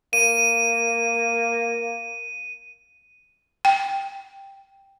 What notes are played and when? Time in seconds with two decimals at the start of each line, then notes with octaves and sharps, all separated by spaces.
0.13 A#3 D#7
3.65 G5